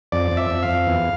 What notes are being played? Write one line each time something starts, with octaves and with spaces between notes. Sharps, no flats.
F2 D5
F2
E5
F2
F5
F2
E2